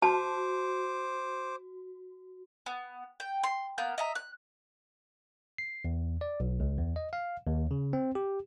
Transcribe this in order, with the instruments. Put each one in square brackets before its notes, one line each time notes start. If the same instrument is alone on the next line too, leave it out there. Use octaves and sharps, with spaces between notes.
[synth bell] F#4 [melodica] C5 D6 [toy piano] A5
[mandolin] B3
G5
C6
A#3 B3 G6
D#5 E5 A#5
F#6
[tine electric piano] C7
E2
D5
B1
C#2
E2
D#5
F5
D#2
C#3
C4
G4